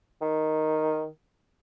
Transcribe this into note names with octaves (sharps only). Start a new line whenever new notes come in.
D#3